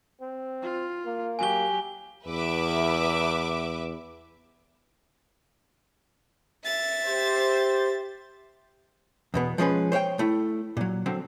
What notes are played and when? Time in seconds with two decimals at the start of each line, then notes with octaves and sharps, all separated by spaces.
0.21 C4
0.62 F4
1.06 A#3
1.39 F#3 G4 G#5 G7
2.27 E2 B4 E5 D6
6.63 E5 A6
7.06 G4 C5
9.34 E2 B2 B3
9.58 F3 G#3 C#4 B4
9.92 C5 C#5 F5 G5
10.19 A3 E4
10.77 A#2 F#3
11.06 D3 F#3 C4